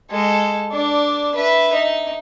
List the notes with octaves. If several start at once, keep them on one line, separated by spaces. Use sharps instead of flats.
G#3 A4
D4 D5
B4 E5
D#4